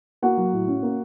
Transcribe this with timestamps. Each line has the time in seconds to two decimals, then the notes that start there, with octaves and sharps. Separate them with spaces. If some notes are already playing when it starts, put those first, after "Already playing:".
0.22 A#3 F#4 F#5
0.37 F#3
0.52 A2
0.67 C#4
0.83 A#3